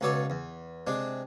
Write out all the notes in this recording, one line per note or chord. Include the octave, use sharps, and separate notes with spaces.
C#2 B2 A4 C#5 D5
E2
C3 G#3 D4